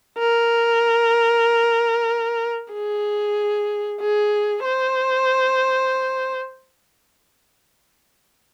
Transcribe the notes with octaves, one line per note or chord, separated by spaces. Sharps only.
A#4
G#4
G#4
C5